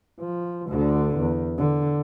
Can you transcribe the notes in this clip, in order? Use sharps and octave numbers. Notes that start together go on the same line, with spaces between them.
F3
D2 D3
E2
D3